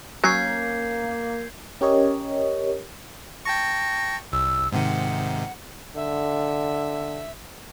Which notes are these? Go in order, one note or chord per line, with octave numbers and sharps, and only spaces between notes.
F#3 A#3 C#4 G6 G#6 C7
C#4 G4 A#4 C#5 D#5
G5 A5 C#6 A#6
C2 E6
G#2 C3 D#3 F#5
D3 E5